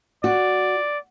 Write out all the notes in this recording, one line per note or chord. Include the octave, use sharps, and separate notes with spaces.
F#4 D5